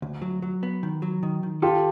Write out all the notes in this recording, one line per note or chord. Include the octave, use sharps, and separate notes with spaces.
D2
F#3
F#3
B3
D#3
F#3
D#3
D#3
F4 G4 A4